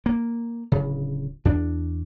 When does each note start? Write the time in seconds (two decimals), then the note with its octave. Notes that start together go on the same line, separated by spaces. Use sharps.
0.06 A#3
0.72 D1 C#3
1.45 E2 D4